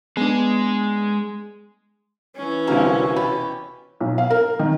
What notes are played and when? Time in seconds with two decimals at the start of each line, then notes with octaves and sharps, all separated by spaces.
0.17 G#3 B3 D4 G#4
2.36 E3 C#4
2.67 C2 D3 A#3 F#4 A#4 F5 G#5
3.16 B2 G4 B5
4.00 B1
4.18 F5
4.30 A#4
4.59 D#3